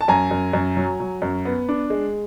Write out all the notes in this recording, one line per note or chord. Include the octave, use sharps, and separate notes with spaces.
A5
F#2 G#5 A#5
F#2
F#2
F#3
F#3
F#2
B3
D4
G#3